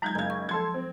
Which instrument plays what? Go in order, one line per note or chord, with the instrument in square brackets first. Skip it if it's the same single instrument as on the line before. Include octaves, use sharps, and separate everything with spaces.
[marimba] F#3 G#3 D#4 [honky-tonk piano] A#5 G6 G#6
[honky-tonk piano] F#1 G#6 [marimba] F5 G#5
[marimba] C#6
[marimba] F3 [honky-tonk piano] A4 C6 G#6
[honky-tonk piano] C4